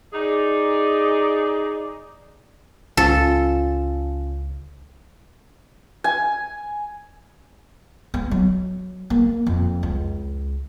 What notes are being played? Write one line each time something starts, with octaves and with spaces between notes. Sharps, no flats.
D#4 G#4 D5
C#2 C#4 F4 A4
G#5
B3
F#3
A#3
F2
C#2